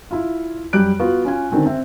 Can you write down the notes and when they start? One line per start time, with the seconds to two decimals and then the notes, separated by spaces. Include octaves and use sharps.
0.11 E4 F4
0.73 F#2 G3 G4 F#6 D7
1.00 B3 F4 F#4
1.25 C#4 F4 G#5
1.51 D3 D#3 C4 C#4
1.66 C4 E5